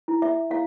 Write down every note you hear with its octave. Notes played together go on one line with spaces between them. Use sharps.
E4
E5
E4 F5